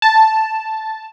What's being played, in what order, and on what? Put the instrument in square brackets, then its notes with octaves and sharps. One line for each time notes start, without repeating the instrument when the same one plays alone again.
[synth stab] A5